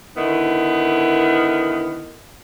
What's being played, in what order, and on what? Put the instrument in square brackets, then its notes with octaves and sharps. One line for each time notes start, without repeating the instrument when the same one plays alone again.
[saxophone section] D3 D#3 B3 E4